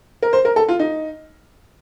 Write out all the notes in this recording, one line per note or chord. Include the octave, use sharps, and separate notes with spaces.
A#4
C5
A#4
A4
F4
D#4